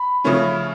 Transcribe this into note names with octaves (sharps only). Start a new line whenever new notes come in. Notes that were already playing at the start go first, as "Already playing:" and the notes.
Already playing: B5
C#3 F3 A3 C#4